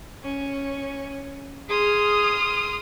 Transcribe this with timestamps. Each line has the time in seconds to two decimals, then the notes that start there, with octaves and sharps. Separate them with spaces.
0.23 C#4
1.70 G#4 C6 D#6 F6